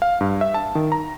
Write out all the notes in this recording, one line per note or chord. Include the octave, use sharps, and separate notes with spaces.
F5
G2
E5
A5
D#3
A#5